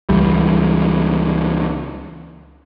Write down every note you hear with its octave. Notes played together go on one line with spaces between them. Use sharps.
C#2 E3 G3